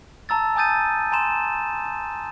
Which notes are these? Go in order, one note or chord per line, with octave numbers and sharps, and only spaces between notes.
A5 A#5 E6 A6
G#5 A5 D#6 G6 A6 D#7
G#5 A#5 C6 E7